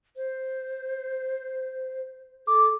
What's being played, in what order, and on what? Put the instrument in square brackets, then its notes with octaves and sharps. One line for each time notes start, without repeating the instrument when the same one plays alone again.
[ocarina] C5
[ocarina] A4 [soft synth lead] D6